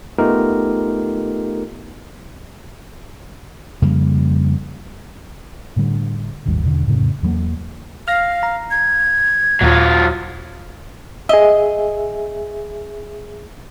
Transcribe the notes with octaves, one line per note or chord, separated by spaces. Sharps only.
A3 B3 D#4 F4 G4 A#4
F2 C#3 G3 A#3
A2 D3 G3
D#1 G#1 D#2 G3
E2 B2 D3
F2 A2 C#3
E2 G2 F#3 A#3
F5 F6 A#6
A#5
G#6
D#2 A#2 F#3 F4
G#4 D#5 E5